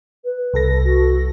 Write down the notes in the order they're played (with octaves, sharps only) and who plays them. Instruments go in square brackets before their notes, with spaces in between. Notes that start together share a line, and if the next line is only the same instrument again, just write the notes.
[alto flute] B4
[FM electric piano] C2 A4 A#6
[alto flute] F#4